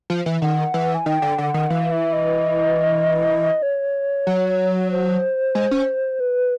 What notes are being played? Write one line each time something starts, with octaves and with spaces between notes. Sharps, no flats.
F3
E3
D#3 F#5
E3
G#5
D#3 G5
D3
D3 F#5
D#3
E3 F5
E5
D#5
C#5
F#3
C5
G#3
C#4
B4